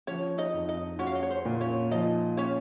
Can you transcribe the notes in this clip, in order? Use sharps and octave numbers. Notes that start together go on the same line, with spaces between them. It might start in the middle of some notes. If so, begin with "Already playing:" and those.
F3 C#4 C#5
D#4 D#5
F2
D#4 D#5
C#4 F#4 C#5
F5
D#5
C#5
C5
A#2
C#4 C#5
F3 D#4 D#5
C#4 C#5